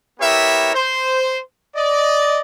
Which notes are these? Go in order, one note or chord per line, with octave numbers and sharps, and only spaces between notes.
B3 E4 G4 A#4 C#5 E5
C5
D5 D#5